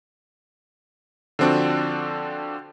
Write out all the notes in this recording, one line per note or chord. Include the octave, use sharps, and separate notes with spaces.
D3 F3 C4 D4 F#4